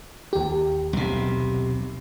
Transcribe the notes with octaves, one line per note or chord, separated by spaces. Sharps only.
D#2 G4
B1 C3